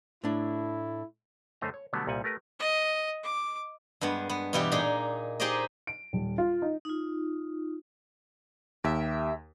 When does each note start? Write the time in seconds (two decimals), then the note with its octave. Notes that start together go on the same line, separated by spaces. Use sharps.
0.24 A2 D4 E4
1.61 F#2 D3 A3 C5 D#5 A#5
1.74 C#5
1.93 B2 D3 F#3 G3 A3 B3
2.07 C2 A#2 G3 F#5 G#5
2.24 A3 G4 A#4 B4
2.59 D#5
3.23 D6
4.01 G2 G#3 B3
4.29 B3
4.53 B2 E3 G3 F4 G4
4.72 A#2 D#4 G#4
5.40 D#4 G4 G#4 C5 D5 D#5
5.87 D7
6.13 D#1
6.38 F4
6.62 D#4
6.85 D#4 F4
8.84 D#2 G4 A#4 E5